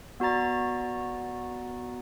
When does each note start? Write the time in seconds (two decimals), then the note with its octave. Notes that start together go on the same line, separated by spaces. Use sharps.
0.20 B3 F#4 D5 A#5 A6